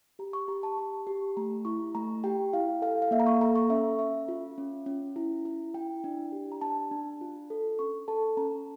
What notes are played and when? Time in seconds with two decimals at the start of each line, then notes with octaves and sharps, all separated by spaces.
0.19 G4 A#5
0.33 C#6
0.48 G4 A#5
0.63 A5
0.77 G4 C#6
1.07 G4
1.37 A3 A#5
1.65 E4 C#6
1.95 A3 A#5
2.24 G4 G5
2.53 E4 F5
2.82 A4 F5
3.02 F5
3.11 A#3 E5
3.20 A#5
3.27 C#6
3.41 A4 A#5
3.56 C#6
3.70 C#4 E5
3.99 C#4 E5
4.28 F4
4.58 C#4
4.86 C#4
5.16 E4
5.45 E4
5.74 E4 G5
6.04 D4
6.32 G4
6.52 A#5
6.61 D4 A5
6.91 D4
7.21 F4
7.50 A4
7.79 C#4 C#6
8.08 A4 A5
8.37 C#4 A#5